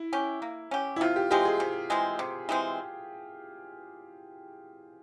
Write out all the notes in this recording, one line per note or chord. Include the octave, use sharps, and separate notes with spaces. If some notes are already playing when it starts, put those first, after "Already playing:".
Already playing: E4
C#4 G4
A#3
C#4 G4
E4
C3 F4
G4
E3 G#3 C4 G4
G#4
C3
E3 G#3 C4
C3
E3 G#3 C4